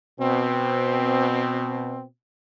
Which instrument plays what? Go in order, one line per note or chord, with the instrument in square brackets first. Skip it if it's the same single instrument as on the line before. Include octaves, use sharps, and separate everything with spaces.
[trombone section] B2 C4